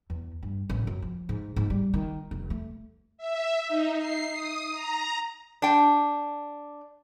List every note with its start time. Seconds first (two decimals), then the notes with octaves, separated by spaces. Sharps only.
0.10 E2
0.43 G2
0.69 A1
0.87 F#2
1.02 F3
1.29 G#2
1.56 G#2
1.70 G3
1.94 D#3
2.31 F1
2.50 A3
3.18 E5
3.68 D#4
3.98 C7
4.30 D#6
4.72 A#5
5.62 D4 G5